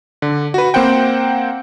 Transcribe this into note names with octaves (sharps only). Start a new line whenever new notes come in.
D3
F#4 B4
A#3 C4 C5 F#5 G5